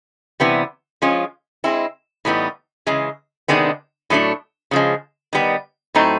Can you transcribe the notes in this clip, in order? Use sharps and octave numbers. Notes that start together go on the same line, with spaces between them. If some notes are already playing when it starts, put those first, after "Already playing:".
C3 E3 G3 B3
F3 G#3 C#4 F4
G#3 C4 E4
A2 E3 G3 B3 D#4
C#3 E3 G#3
C3 D#3 G#3 B3 D4
A2 F#3 A3 D4
C#3 F3 G#3
D#3 G3 B3
A2 F#3 A3 C4 D#4